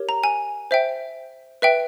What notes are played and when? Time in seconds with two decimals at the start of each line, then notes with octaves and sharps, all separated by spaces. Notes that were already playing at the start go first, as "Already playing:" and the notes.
Already playing: G4 A#4 C#5
0.09 A#5
0.24 G#5
0.71 C5 E5 G5
1.62 B4 E5 G5